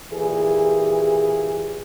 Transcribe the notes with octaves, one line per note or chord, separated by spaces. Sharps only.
A#2 E3 G4 G#4